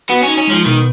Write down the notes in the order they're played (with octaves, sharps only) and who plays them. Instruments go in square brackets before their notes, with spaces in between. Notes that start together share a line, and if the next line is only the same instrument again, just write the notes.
[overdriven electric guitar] B3 [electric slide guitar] F#4
[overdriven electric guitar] C#4 [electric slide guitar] D#4
[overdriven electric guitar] C#4
[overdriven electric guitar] F3 [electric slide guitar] G#3
[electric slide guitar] B2 [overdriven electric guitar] D#3